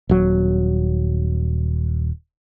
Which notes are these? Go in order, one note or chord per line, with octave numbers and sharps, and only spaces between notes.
D#1 F#3